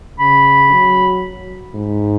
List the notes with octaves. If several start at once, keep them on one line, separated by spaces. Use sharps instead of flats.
C#3 B5
F#3
G#2